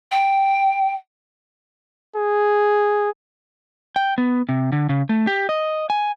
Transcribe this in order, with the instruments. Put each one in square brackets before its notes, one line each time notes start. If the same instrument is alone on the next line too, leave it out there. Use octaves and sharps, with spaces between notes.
[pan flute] G5
[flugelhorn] G#4
[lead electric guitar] G5
B3
C3
D3
C#3
A3
G4
D#5
G#5